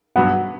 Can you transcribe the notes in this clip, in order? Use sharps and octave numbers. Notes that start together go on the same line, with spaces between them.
G2 F#3 B3 F#5